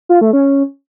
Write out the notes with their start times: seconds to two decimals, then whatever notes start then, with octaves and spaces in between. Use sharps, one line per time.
0.09 F4
0.21 A3
0.33 C#4